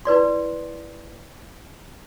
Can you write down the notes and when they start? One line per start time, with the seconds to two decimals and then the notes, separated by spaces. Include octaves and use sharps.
0.05 E4 B4 D5 C6